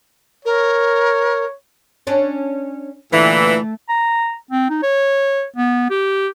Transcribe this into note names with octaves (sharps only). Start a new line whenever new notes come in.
A#4 C#5
C#4 D4 C#5
A#2 D3 E3 A3
A#5
C4
D#4
C#5
B3
G4